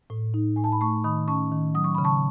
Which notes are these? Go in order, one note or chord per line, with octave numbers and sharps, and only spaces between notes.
A2
D#4
A2 G#5
A5
B5
A3 A5 C#6
D#3 B5 D#6
C#4 A5 C#6
D#3
F#3 D#6
C#6
C#3 B5
A5 C#6